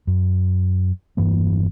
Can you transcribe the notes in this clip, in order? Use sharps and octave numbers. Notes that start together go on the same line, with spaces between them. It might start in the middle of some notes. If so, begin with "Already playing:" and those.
F#2
E1 G2 E3 A#3